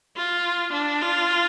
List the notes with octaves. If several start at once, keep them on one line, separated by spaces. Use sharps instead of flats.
F4
D4
F4